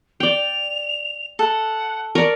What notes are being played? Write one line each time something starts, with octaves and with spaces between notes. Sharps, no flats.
D5 G5 F7
A4 F#5
A#4 D5 C#6